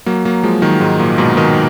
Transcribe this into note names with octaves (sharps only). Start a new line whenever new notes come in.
F#3 A#3
F#3 A#3
F3 G#3
D#3 F#3
G#2
A#2
G#2 B2
B2 D#3